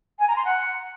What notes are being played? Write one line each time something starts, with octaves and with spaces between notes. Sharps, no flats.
G#5
A#5
C6
F#5